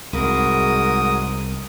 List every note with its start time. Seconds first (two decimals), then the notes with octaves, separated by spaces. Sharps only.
0.13 C2 G#2 G#3 F#4 A#4 D#6